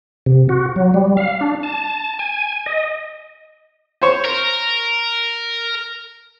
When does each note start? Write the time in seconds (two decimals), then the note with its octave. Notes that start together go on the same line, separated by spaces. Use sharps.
0.26 C3
0.49 F#4
0.76 F#3
0.94 G3
1.17 F5
1.41 D4
1.63 A5
2.19 G#5
2.66 D#5
4.02 C5 C#5
4.25 A#4